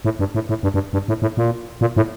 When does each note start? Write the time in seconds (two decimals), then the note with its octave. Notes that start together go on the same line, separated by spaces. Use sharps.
0.05 A2
0.19 G2
0.35 A2
0.49 A2
0.63 G2
0.74 G2
0.93 G2
1.08 A2
1.22 A2
1.37 A#2
1.81 A#2
1.97 A2